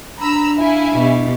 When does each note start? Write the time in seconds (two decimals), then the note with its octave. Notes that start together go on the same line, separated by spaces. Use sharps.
0.21 D4 A#5 B5 E6
0.59 E4 F5 G#5
0.93 B2 G4